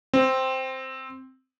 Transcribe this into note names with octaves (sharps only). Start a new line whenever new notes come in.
C4